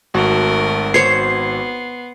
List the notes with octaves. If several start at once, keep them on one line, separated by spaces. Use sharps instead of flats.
G#1 A3 F#4 A#4
B3 C5 C#5 C7